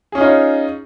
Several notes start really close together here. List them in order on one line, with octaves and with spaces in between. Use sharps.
G#4 C#4 F4 D#4 C#5